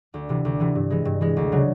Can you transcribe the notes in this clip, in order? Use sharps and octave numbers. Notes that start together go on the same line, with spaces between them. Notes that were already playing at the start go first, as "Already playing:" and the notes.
D2
C3 E3
D2
C3 E3
G2
E3 G#3
G2
E3 G#3
D2
C#3 F#3